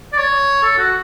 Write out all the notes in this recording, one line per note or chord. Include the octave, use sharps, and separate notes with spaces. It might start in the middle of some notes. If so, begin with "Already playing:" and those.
D5
C#5
A4
F#4